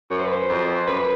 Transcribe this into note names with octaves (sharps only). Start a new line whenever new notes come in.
F#2 C#5
C5
B4
C5
F2
F#2 B4